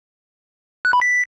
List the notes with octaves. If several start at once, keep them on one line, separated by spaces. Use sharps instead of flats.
F#6
B5
B6